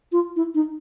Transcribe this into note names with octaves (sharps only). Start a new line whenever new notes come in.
F4
E4
D#4